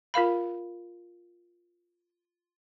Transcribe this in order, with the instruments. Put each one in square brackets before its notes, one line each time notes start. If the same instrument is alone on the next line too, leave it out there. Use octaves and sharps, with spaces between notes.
[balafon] F4 A#4 F5 B5